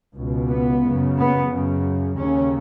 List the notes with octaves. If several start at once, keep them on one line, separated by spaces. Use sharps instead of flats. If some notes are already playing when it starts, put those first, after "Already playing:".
C#2 B2
B3
F#2 C#3
B3
F#2 C#3
D#2 C#3 C#4